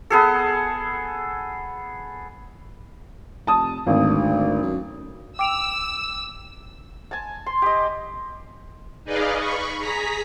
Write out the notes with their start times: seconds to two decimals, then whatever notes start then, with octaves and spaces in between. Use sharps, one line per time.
0.10 B3 G#4 A4
3.47 F1 A5 D#6
3.87 G#1 D2
4.63 F#2
5.39 G5 D6 E6 D7 F7
7.11 G#5 A5
7.46 C6
7.62 G4 D#5
9.04 D#4 G#4 B4 D5 D#5 F5
9.38 B5 C#6
9.78 G#4 A#5 B6